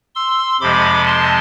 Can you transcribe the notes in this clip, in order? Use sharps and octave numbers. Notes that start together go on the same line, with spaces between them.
C6 E6
F2 C3 F3 G#3 B5 D6
A5 C6